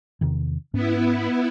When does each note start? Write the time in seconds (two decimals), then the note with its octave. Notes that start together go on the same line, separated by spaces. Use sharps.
0.21 E2 C3 D#3
0.74 G#2 B3 C#4 E4